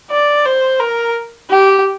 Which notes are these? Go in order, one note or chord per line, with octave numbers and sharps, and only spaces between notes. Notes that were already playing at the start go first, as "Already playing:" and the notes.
D5
C5
A#4
G4